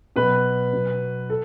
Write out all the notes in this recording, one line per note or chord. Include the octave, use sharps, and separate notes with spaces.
B2 F#3 B4
B2 F#3
A4